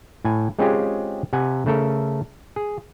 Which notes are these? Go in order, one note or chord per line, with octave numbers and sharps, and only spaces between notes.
A2 G#5
G#3 C4 C#4 F4 G4 G#4
C3 F#5 G#5
C#3 A3 A4 A#4
G#4